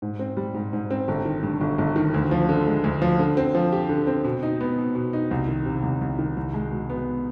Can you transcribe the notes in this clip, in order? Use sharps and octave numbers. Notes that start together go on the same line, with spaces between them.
G#2
C4
G3
G#2
G#2
C4
G1
D#3
G2
G1
G1
D#3
D2
F3
D3
G#3
D2
F3
D3
C4
F3
G4
D3
C4
B2
D#4
B3
B2
B2
D#4
C2
D#3
C3
C2
C2
D#3
C2
G#3
B2
B3